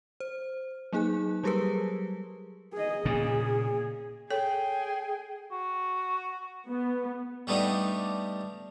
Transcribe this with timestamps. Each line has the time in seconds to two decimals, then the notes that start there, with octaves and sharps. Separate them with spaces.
0.20 C5
0.93 F#3 A#3 D#4 G#4 G#5 F#6
1.44 F#3 G3 G4 G#4 A#4 B4
2.73 G#4 D#5
3.05 A#2 C#3 G#4
4.31 G#4 A4 C#5 G5
5.51 F#4
6.69 B3
7.47 G3 A3 B3 D4 D#4 G4